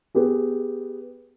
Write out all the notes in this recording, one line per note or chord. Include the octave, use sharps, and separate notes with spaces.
B3 G4 G#4